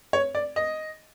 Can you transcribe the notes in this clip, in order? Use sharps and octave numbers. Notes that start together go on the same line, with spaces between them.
C#5
D5
D#5